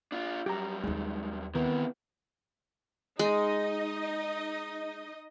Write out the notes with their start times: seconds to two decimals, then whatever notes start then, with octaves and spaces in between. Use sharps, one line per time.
0.12 D4 F4
0.46 F#2 G3 G4 A#5
0.84 D#2 G#3 C4 D#4
1.55 C3 D#3 E3 B3
3.19 G#3 D#4 D#5